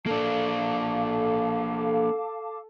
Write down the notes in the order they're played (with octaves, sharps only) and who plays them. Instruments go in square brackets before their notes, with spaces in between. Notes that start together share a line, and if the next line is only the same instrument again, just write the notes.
[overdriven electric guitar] A#3 D4 [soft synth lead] A4 [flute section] F5 A5 D6